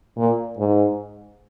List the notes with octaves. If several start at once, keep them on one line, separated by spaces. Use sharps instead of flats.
A#2
G#2